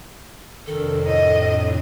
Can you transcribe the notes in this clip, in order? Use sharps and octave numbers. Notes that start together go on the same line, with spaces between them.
F2 C3 D#3 D4 A4
A2 D#5